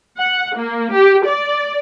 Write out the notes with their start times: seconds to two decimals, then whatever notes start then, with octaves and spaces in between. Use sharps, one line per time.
0.18 F#5
0.55 A#3
0.92 G4
1.25 D5